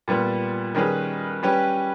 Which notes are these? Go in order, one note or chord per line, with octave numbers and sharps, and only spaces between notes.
A#2 G3 B3
D#3 G3 C#4 G#4 B4
G3 C#4 G4 B4